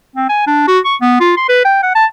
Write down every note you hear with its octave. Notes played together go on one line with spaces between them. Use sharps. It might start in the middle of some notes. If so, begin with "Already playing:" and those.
C4
G#5
D4
F#4
C#6
B3
F4
C6
B4
G5
F#5
A5